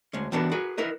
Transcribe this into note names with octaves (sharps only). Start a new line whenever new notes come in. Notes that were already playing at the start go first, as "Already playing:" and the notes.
D2 G#3 C#4
E3 G3 B3 D4 F#4 A#4
F#4 G#4 A#4 B4
E4 A#4 B4 D#5